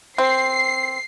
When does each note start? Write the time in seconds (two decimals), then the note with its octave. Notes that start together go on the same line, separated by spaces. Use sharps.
0.18 C4 C7